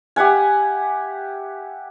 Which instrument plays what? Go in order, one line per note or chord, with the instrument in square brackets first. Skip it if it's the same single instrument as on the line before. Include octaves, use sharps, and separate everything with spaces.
[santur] G4 E5 F#5 G#5